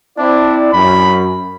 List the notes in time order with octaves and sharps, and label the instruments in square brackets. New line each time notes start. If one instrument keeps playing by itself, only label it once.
[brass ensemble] C4 E4 D5 [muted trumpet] D4
[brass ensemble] F#2 [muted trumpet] B5